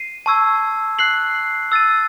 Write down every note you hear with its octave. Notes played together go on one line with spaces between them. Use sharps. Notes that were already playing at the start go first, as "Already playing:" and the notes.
Already playing: C7 D#7
A5 C#6 E6 G#6
F#6 C7 F#7
E6 A6 D#7